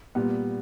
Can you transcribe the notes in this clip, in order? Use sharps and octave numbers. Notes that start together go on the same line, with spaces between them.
A#2 G3 B3